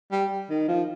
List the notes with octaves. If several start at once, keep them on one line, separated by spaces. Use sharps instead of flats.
G3
D#3
F3